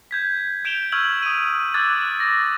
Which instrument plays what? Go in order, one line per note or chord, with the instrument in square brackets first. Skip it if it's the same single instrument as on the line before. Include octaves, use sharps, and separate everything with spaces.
[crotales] G6 G#6 B6
G6 D7 E7 F7 G7
C#6 E6 F6 G#6 F#7
D#6 D#7
D6 E6 F#6 G#6 A6
A#6